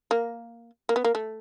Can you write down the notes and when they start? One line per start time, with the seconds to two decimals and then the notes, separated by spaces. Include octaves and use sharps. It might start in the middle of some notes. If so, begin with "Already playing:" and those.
0.11 A#3
0.89 A#3
0.96 B3
1.04 A#3
1.15 A3